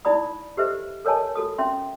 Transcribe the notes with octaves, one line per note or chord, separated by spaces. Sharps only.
D#4 E4 D5 B5 D#6
G4 A4 B4 C5 D#5 E5
A4 A#4 C#5 D#5 G#5 A5
F#4 A4 D#6
C#4 E5 C6